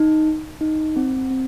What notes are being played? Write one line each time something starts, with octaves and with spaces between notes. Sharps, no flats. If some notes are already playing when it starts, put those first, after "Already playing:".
Already playing: D#4
D#4
C4
C4